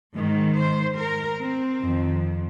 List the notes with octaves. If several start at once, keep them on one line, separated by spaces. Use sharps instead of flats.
G#2 D#3
C5
A#4
C4
F2 D#3